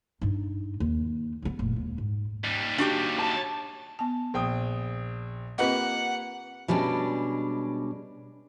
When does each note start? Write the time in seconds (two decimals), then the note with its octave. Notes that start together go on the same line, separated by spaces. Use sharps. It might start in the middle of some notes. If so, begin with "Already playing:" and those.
0.21 G2 D#4
0.80 D#2
1.42 B3 C#4
1.59 F1 A#2
1.76 D#2 G#3
1.98 G#2
2.44 D#2 G3
2.78 D4 F#4 G4
3.19 A5
3.99 B3 A5
4.34 A#1 G5 D#6
5.58 A#3 C4 F4 G4 B4 D#5 F#5
6.68 B2 G3 G#3 C#4 D4